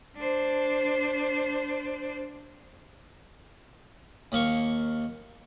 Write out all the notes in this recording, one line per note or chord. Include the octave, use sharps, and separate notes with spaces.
D4 C5
D#2 A#3 C#6